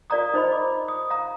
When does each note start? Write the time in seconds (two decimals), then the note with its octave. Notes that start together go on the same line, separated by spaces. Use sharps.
0.10 F4 A#4 D5 F5 A#5 D#6
0.34 D#4 C5 D#5 B5
0.52 D6
0.88 D#6
1.10 F5 A#5